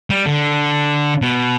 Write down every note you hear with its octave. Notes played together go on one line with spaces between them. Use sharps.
G3
D3
B2